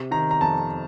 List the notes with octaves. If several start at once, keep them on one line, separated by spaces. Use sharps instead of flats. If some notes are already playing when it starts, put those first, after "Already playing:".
Already playing: C3
D#3 A#5
A#5
F2 A5